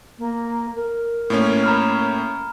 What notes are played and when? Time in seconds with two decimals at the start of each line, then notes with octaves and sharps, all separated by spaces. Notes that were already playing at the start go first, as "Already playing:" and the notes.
0.18 A#3
0.75 A#4
1.30 A2 A#3 C#4
1.64 A#5 B5 F6